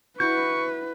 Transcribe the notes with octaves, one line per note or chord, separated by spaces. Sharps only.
E4 F#4 B4 C#6 G6